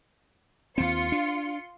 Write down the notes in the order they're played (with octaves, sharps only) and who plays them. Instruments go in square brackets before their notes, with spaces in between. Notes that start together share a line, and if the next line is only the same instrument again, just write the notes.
[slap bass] D#2 C4 [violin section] F4 C6 C#7
[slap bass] D4